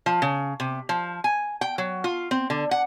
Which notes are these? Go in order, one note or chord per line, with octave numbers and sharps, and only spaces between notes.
F3
C#3
C3
F3
G#5
G5
F#3
F4
C4
D3
F#5